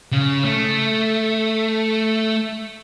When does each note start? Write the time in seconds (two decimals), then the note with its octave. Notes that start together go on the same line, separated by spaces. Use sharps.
0.12 C#3
0.45 A3